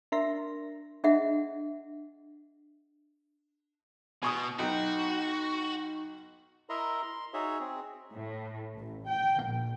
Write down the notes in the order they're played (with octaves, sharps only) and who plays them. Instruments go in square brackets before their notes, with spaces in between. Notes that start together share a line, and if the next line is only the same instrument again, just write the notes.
[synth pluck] D4 A#4 E5 C6 A#6
[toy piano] D4 G#4 D#5 E5 F#5
[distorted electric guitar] B2 [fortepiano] G#5 C#6 D#6
[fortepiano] B1 [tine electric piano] D#4 G5 [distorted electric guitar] F#4
[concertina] E4 A#4 D#5 E5 A#5 C6
C6
D#4 F#4 G#4 C#5 E5
C4 G#4
[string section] A2
A1
G5
A#1